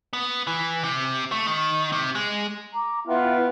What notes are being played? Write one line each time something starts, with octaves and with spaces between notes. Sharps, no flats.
B3
E3
C3
A3
D#3
C3
G#3
A#5 D6
B3 E4 F4 B4 G5